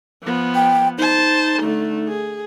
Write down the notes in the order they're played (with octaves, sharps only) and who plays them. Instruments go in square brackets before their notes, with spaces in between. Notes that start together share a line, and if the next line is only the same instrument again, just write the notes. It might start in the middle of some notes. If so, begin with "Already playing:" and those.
[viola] F3 B3
[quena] G5
[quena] D#4 [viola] C5 A5
[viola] D3 A3
G#4